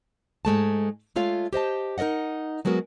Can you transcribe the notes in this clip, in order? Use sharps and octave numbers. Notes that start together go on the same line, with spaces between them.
G#2 G#3 A3 A5
G#3 A3 F4 C#5 F5
G4 C5 D#5 A5
D#4 A#4 D5 D#5 F#5
F#3 G#3 B3 F#4 A#4